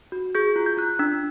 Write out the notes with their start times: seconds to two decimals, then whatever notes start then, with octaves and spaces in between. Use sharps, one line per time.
0.12 F#4
0.35 G#4 G6
0.56 F4
0.66 G6
0.77 F4 F#6
0.99 D4